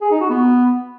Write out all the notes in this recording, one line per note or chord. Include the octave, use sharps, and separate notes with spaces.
G#4
D#4
F#4
B3